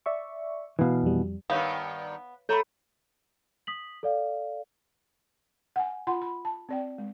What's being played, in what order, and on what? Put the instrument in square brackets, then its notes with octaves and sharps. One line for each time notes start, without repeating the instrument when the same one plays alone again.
[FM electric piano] D5 E5 C#6
[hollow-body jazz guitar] B2 E3 [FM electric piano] B4 F5
[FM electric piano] F2 G3
[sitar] G2 D#3 [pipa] B3 [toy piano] C#5 F5
[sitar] A3 [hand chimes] A4 B5 [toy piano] C#5 A#5
[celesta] D#6 B6 F#7
A4 D5 F5
[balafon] F#5 G#5
F4 F#5 B5 C6
B5
A5
C4 D5 G5
G#3